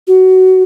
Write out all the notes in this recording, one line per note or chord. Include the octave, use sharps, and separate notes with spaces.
F#4